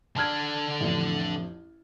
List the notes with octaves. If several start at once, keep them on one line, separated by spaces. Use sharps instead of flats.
D3 D4 A5 F6 G#6
A1 F2